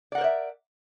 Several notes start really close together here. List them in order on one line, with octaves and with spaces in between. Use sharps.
D5 F#5 A#4 C5 E5